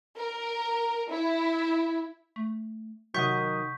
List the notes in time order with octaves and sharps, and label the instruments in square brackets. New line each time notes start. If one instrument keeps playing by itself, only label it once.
[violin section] A#4
E4
[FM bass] A3
[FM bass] C3 [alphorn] D#3 [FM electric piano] F#3 F#5 D#6 [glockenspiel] C#6 G6 B6